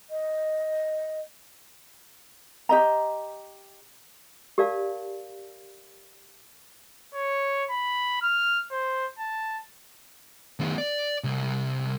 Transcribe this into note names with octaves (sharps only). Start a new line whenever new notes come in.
D#5
G4 D#5 A#5
G4 A#4 D5 F5 A5
C#5
B5
F6
C5
A5
D#3 B3
D5
C2